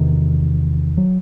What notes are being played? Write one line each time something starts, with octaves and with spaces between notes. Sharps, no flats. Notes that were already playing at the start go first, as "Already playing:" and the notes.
Already playing: E2 C3 D#3
F#3